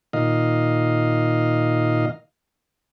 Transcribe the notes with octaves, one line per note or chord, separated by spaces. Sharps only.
A#2 D#3 D#5 F5